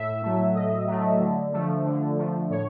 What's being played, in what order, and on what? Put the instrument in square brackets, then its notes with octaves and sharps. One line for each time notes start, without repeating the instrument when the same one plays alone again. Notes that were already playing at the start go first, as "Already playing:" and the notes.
Already playing: [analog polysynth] A2 E5
F#3 A3
A2 D#5
F#3 A3
D3
F3 A3
D3
F3 A3
A2 C#5